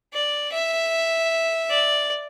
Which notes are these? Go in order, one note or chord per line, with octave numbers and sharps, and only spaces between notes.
D5
E5
D5